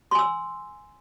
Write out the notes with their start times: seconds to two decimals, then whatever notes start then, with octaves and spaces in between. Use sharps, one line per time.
0.11 C6
0.15 G#5
0.19 E6